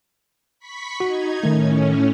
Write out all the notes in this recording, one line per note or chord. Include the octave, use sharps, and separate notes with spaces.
B5 C#6 B6
D#4 F#4 G#6
A2 D#3 A3 C#4